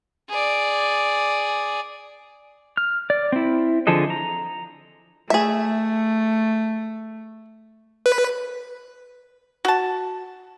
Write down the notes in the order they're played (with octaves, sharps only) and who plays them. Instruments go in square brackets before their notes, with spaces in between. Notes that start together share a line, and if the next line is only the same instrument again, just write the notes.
[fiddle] G#4 D5
[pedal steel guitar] F6
D5
C4 E4
D3 F3 G#4 A4 D#5
A#5
[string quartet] A3 [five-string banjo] G#4 E5
[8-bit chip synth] B4
[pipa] F#4 A5